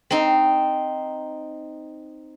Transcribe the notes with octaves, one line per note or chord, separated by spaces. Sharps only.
C4 D#4